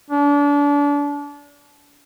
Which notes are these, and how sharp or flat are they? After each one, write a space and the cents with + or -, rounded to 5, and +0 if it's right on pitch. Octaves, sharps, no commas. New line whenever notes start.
D4 -30